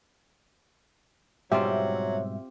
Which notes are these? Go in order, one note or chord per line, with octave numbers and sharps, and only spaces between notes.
G#2 B2 F#3 G3 C4 F4 G4 E5